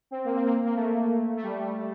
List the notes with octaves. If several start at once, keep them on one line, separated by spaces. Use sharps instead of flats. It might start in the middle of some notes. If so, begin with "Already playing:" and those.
C4
A#3
C4
A#3
A#3
A3
A3
G3